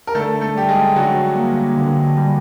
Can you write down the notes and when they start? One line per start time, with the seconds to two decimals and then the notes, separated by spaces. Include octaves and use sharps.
0.07 A#4
0.15 D3 A3 A4
0.41 A3 A4
0.55 G3 G4
0.68 G#3 G#4
0.95 D3 F#3 F#4
1.35 A#3
1.77 D3
2.17 G3